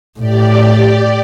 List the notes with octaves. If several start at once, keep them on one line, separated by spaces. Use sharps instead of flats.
A2 G4 D5